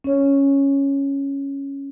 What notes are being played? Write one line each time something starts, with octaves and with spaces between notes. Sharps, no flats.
C#4 C#5